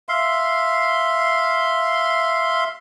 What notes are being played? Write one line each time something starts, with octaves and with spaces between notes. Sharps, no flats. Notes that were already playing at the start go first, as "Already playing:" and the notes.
E5 F5 C6